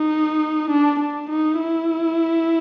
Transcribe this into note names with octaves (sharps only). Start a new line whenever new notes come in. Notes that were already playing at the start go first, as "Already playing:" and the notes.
Already playing: D#4
D4
D4
D#4
E4